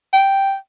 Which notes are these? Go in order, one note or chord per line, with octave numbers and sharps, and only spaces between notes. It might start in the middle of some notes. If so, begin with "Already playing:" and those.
G5